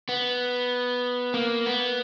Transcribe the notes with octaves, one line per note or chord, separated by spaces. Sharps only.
B3
A#3
B3